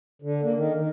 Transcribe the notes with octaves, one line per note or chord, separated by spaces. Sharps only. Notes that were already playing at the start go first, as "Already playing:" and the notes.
D3
A#3
D#3
D#3